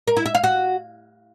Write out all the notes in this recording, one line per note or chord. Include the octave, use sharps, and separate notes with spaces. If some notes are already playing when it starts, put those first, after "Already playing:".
A#4
E4
E5
F5
F#4